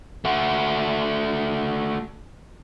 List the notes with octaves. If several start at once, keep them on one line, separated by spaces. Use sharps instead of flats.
A3 F#4